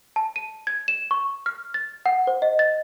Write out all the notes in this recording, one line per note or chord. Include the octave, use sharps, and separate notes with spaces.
A5
D#7
G#6
E7
C#6
F6
A6
F#5
C5
D#5
A6